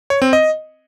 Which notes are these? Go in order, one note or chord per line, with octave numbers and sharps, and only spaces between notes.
C#5
C4
D#5